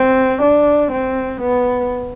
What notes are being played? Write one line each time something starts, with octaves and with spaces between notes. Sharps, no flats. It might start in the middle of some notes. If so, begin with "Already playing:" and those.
Already playing: C4
D4
C4
B3